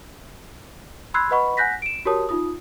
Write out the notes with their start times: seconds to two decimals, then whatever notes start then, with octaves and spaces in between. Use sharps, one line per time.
1.14 B5 C6 E6 F#6 G#6 C7
1.31 B4 D#5 F#5 B5 C#6
1.57 F#5 G#5 F#6 G6 A#6 B6
1.82 D7 E7
2.05 F#4 G4 A#4 C#5 A5 D#6
2.29 D#4 F4 D#6